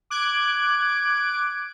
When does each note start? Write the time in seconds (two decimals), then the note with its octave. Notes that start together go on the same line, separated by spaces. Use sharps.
0.10 D6 F#6 G#6 D7